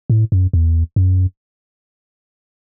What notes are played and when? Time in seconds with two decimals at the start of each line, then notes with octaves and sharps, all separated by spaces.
0.10 A2
0.32 F#2
0.53 E2
0.96 F#2